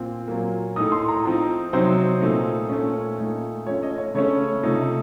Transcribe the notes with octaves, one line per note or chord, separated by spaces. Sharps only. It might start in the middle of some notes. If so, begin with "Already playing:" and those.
Already playing: A#2 F3 C4
A#2 F#3 A#3
A2 A3 D#4 D#6
C6
A#5
F3 C4 D#4
C3 F#3 C4 D#4 C5
A#2 A3 D#4
A#2 A3 C#4
A#2 A3 D#4
F3 A3 C#4 C#5
D#5
C#5
C#3 A3 C#4 C#5
C3 F3 A3 D#4